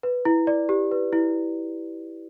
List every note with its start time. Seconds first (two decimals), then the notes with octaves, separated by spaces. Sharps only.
0.03 B4
0.25 E4
0.47 D5
0.69 G4
0.91 B4
1.13 E4